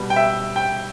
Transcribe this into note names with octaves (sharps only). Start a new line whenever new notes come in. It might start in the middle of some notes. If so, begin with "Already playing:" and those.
Already playing: B2 G3 B3
G5
E5
G5